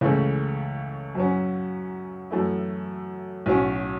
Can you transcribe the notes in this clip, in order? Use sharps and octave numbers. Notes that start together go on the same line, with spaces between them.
C#2 C#3 E3 A3 C#4
F#2 F#3 C#4
F#2 E3 A3 E4
B1 A2 F#3 C#4